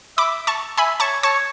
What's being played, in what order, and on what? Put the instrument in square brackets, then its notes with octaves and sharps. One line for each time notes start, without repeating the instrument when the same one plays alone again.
[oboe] E5 [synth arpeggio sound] B5 D6
[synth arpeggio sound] A5 C#6
[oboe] E5 [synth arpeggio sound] G#5 B5
[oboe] C#5 [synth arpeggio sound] A5 C#6
[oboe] C#5 [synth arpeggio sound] A5 C#6